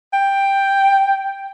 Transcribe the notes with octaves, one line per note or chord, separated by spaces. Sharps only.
G5